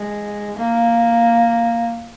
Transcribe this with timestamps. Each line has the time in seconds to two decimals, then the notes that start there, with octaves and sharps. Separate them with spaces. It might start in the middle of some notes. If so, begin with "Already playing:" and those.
Already playing: G#3
0.57 A#3